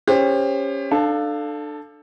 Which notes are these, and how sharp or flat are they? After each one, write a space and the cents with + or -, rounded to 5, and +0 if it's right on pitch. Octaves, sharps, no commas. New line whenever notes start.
C#4 +0 G4 +30 C5 +0
D4 +30 A4 +0 F5 +0